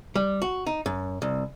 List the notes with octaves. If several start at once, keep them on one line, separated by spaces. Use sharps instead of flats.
G3
F#4
D#4
F#2
C2